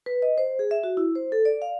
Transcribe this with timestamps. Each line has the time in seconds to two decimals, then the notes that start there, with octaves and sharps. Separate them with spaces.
0.06 B4
0.22 D#5
0.38 C5
0.59 G#4
0.71 E5
0.83 F#4
0.97 E4
1.15 C5
1.32 A4
1.45 D5
1.62 F5